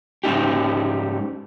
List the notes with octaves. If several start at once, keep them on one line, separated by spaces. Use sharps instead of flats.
G#2 C#4 D#4 G4